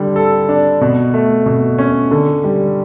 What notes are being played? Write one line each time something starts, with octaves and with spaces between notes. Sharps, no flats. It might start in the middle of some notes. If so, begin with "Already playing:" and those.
Already playing: D3 G3
A4
D4
B2
A3
B2
C#4
D3
G3